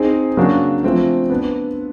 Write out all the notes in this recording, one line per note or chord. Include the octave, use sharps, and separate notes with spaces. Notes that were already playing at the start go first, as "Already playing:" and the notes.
Already playing: C4 D#4 G#4
C#3 F#3 A#3 D4 F#4
F3 A3 C4
B3 D4